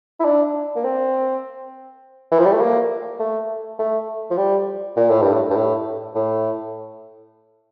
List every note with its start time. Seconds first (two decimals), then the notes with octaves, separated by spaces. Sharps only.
0.20 E4
0.25 D4
0.76 A#3
0.84 C4
2.32 E3
2.40 F3
2.46 G3
2.53 A3
2.62 A#3
3.20 A3
3.79 A3
4.31 F3
4.38 G3
4.97 A#2
5.09 A2
5.22 G2
5.33 A2
5.51 G2
5.57 A2
6.15 A2